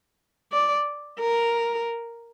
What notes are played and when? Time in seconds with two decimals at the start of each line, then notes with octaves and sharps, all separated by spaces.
0.52 D5
1.20 A#4